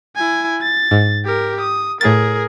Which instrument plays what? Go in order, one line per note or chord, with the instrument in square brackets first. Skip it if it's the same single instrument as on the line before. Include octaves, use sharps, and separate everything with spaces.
[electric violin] E4 G#5
A6
[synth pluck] G#2
[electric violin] G4 A#4
D#6
[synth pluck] A2 A6 [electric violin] G#4 A#4